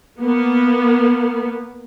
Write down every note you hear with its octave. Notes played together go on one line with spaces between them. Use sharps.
A#3 B3